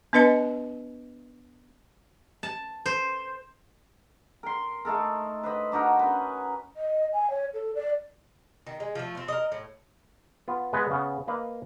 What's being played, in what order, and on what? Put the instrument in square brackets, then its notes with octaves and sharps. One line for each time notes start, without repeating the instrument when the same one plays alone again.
[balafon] B3 D4 B4 D#5 A5
[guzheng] A5
C5
[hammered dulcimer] A#4 C6
A3 D#4 A4 A#4
B4 C5 D#5 B5
D4 D#4 F#4 A#4
C#4 B4
[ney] D#5
G#5
C#5
A4
D5
[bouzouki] D#3
G#3
F3 A3
C4 F4
A#4 D#5
A2
[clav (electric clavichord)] B3 F4
G#3 B3 B4 D#5 F#5
C#3 B3
A#3 B4 D#5 F5